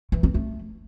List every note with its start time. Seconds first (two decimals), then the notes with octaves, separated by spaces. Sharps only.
0.12 E3
0.23 C4
0.34 A3